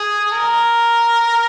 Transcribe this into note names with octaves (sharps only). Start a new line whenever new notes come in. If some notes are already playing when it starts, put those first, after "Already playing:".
Already playing: G#4
A#4